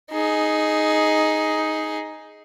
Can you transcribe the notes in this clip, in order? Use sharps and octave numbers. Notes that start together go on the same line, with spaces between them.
D#4 G#4